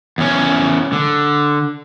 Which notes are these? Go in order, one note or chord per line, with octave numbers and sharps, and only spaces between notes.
E2 C#4
D3